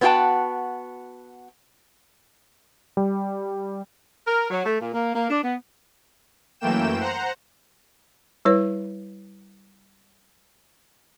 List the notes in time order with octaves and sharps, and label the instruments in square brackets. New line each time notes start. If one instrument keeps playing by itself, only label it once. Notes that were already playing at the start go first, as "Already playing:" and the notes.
[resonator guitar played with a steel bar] B3 C#4 F#4 G4 G5 A5
[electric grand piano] G3
[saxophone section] A#4
F#3
A3
A#2
A#3
A#3
D4
B3
[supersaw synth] F#2 E3 A3 A#3 G5 E7
C5 F#5 A#5
[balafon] G3 E4 B4 C#5